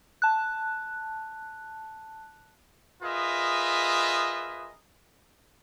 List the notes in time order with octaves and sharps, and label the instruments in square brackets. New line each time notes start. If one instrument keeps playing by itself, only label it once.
[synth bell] A5 F#6
[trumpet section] F4 G#4 A#4 B4 D#5 E5